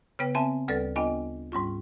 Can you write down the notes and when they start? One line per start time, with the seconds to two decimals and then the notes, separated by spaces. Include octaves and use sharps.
0.19 C#3 B3 B4 G5
0.35 C4 E5 G#5 A5
0.68 D2 G3 A4 B4 D5 A6
0.96 B3 D4 F4 D#5 G5 G#5
1.52 G#2 G3 C#4 F4